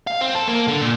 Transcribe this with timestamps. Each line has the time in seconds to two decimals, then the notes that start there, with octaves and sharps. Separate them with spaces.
0.07 F5
0.21 C4
0.35 A4
0.47 A#3
0.68 D3
0.82 A#2